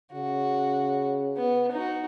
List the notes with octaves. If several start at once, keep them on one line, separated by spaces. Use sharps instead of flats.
C#3 F#4
B3
D#4 F#4